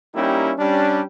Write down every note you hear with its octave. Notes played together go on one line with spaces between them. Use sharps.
G3 A#3 C#4 D#4 E4 G4
G3 C#4 D4